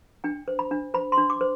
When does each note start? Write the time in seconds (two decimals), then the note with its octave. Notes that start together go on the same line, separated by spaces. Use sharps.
0.24 D4 G5
0.48 C5
0.59 B5
0.71 D4
0.94 C5 B5
1.12 C6
1.18 D4
1.30 D6
1.41 C5